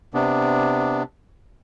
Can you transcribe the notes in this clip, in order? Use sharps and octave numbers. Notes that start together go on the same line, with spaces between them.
C3 B3 D4